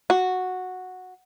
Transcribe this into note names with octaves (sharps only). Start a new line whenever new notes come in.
F#4